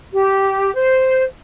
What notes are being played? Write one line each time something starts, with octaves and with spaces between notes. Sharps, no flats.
G4
C5